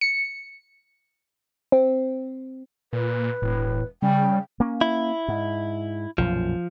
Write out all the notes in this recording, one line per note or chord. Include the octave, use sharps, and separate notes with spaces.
C#7
C4
A#2 B4
E1 A2
C#3 G3 G5
A#3 C#4
E4
G#2
B1 F#2 A#2 F3